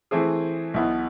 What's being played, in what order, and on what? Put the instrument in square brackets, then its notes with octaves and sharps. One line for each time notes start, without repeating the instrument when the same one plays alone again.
[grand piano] E3 A3 C4 G#4
B1 B2 B3 E4